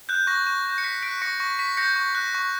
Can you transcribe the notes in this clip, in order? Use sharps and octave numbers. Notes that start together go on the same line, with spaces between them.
F#6 G6
C#6 A#6
C#6
G6
C#7
F#6 B6
F#6 B6 D7
C#6 A#6 C#7
C#6 A#6
C#6 B6
G6 A#6 C#7
C#6
F#6
C#6